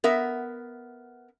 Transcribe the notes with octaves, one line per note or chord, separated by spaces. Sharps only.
B3 A#4 E5